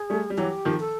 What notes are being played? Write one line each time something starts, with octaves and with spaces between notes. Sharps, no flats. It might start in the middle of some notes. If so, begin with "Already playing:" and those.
Already playing: G#4
G3 A3
G3
E3 F#3 G4
D#3 F3
A4